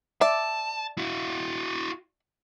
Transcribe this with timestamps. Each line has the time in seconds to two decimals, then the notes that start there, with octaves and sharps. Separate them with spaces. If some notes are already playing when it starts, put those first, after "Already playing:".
0.21 D5 E5 A5
0.98 E4 F#4